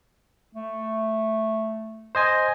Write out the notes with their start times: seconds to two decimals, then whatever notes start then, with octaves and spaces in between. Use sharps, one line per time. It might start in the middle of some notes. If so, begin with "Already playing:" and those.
0.55 A3
2.15 C5 D#5 G#5